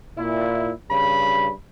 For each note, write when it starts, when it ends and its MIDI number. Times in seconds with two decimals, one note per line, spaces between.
0.18 0.71 46
0.18 0.71 64
0.90 1.51 43
0.90 1.51 49
0.90 1.51 83